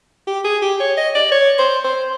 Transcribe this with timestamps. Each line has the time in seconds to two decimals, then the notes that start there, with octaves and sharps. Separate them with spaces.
0.27 G4
0.44 G#4
0.62 G4
0.80 C#5
0.97 D#5
1.15 D5
1.32 C#5
1.59 C5
1.84 C5